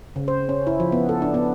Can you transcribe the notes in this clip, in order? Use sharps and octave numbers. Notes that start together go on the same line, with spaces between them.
C#3
C5
C#4
E4
F3
B3
A4
D4
B3